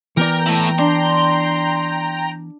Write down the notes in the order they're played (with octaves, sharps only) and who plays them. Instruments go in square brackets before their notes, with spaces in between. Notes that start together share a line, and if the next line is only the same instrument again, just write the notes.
[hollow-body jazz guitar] E3 B3 D5 [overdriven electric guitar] A#4 [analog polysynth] G5 A#5
[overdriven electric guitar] A3 E4
[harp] D4 [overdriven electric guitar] C6